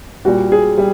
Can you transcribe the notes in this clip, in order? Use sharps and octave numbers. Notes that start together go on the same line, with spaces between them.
A#2 G3 F#4
G#4
G3